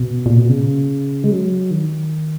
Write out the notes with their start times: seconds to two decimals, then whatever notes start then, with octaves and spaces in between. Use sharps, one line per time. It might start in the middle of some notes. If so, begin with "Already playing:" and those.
Already playing: B2
0.26 A#2
0.38 B2
0.49 C#3
1.24 G#3
1.31 F#3
1.71 D#3